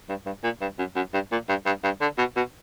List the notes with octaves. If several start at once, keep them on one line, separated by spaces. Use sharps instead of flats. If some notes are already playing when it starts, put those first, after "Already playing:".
G2
G2
A#2
G2
F#2
F#2
G2
A#2
G2
G2
G2
D3
B2
B2